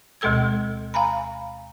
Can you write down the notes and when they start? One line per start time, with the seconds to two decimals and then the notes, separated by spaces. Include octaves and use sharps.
0.21 D2 B2 G#3 A4 E6 G#6
0.94 F5 G#5 A#5 B5